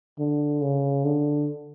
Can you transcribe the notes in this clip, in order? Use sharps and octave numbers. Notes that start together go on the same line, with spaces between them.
D3
C#3
D3